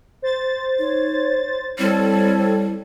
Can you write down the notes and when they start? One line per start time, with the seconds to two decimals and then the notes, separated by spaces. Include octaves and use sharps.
0.22 C5 A6
0.79 D#4 C#5
1.79 G3 C4 E4 A4 C#5